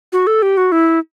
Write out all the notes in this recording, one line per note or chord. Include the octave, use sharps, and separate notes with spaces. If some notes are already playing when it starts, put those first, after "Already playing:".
F#4
A4
G4
F#4
E4